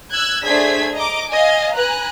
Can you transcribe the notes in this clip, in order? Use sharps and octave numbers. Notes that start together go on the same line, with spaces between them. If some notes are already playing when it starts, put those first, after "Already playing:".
E6 F#6 G#6
A3 D4 G#4 C5 G#6 B6
D#5 A#5 D6
D#5 F5 G#5
B4 G#5 A#5 F#6